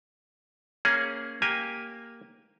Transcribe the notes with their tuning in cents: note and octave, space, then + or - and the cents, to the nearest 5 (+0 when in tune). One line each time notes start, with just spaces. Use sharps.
A#3 +0 C#4 +0 G#4 +0
A#3 +0 G4 +0 G#5 -10